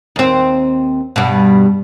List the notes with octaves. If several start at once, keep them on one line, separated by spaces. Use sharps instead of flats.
D#2 C4
G2 B2